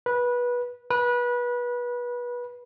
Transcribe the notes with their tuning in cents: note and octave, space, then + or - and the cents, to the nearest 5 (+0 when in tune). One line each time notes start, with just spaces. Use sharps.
B4 -20
B4 -25